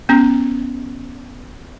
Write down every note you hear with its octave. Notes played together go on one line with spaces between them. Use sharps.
B3 C#4